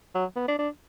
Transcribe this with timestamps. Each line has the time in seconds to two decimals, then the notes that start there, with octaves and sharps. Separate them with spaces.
0.15 F#3
0.36 B3
0.48 D4
0.59 D4